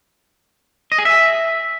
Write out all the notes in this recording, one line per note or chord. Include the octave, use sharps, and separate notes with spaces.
D#5
G#4
E5